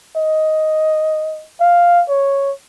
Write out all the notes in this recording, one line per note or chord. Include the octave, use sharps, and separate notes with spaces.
D#5
F5
C#5